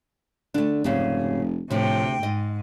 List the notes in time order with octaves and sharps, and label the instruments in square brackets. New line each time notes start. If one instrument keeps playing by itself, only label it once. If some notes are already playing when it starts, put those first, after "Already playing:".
[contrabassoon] D3 [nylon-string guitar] A3 D4
[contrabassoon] F1 [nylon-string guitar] G#2 C#3 G3
[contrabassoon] D2 [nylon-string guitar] A2 F3 [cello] C3 G5
[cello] G#2 [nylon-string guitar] D#5